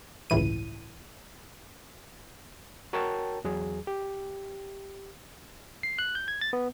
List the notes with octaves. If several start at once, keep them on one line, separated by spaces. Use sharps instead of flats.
G1 C#2 A2 E3 D#7
F#4 A#4 C#5 G5 A5
E2 F#3 G#4
G4
C7
F#6
G6
G#6
A6
B3